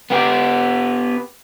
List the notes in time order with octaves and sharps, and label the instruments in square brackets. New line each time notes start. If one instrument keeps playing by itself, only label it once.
[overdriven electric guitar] B3 G4